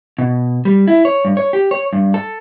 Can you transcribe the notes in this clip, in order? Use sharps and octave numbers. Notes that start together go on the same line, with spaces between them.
B2
G3
E4
C#5
G2
C#5
G4
C#5
G2
A4